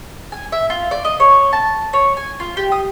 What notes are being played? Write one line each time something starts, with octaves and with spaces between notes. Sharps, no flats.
G#5
E5
F4
D5
D#5
C#5
A5
C#5
G#5
F4
G4
D#6